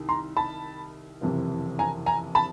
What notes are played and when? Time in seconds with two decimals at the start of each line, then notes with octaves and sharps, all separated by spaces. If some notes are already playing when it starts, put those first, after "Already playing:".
Already playing: C2 D#3
0.09 A#5 C6
0.37 A5 B5
1.21 F#1 F2 C3 E3
1.79 G#5 A#5
2.06 G#5 A#5
2.35 A5 B5